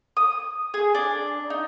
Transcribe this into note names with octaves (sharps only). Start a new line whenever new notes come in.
D#6
G#4
D4
D#4